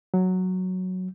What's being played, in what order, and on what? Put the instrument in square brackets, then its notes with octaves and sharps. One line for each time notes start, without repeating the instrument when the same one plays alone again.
[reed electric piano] F#3